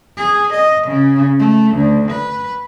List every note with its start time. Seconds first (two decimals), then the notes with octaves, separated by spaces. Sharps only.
0.17 G#4
0.53 D#5
0.87 C#3
1.39 A3
1.75 D2
2.12 B4